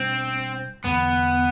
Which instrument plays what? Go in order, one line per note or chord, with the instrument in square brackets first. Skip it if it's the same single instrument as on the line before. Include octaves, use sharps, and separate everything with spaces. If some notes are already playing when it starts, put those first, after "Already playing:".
Already playing: [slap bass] B2 G3 D4 [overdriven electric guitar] C4
[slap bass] E2 D3 G3 [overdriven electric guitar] B3